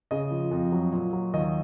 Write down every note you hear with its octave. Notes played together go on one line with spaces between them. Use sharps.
C#3 D#5
F3
F2
F#3
A#2
F#3
D#2 D#5